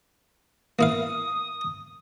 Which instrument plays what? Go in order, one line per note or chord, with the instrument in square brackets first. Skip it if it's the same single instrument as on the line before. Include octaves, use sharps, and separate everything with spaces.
[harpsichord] A#3 E4 F5 [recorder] D#6